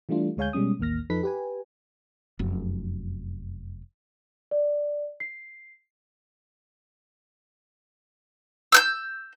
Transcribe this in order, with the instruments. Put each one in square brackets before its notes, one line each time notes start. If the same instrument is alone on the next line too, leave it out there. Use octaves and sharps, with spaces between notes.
[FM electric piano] E3 G3 A3 D4 F4
D2 G#3 C#5 F5 G#5 G6
B2 G3 G#3 C#4 D#6
A1 D#2 A#3 F6 A#6
F2 F3 D#4 A4 B4 B6
G4 B4 G#5
[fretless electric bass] F1 F#2
[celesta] D5
C7
[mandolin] E6 F#6 G6